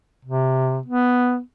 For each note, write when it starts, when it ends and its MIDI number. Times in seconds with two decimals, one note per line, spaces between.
0.25 0.81 48
0.86 1.40 59